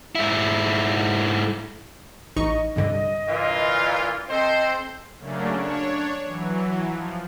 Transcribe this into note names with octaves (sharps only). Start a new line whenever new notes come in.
G#2 E4
A1 D#4 D#5 C#6
C2 G2 D3 D#5
A#2 E3 F4
C4 A4 C5 D#5
C#3 F#3 A3 A#3 C#4 D4
D4 C#5
E3 F#3
F3